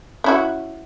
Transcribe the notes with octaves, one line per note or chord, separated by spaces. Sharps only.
C#4 E4 F#4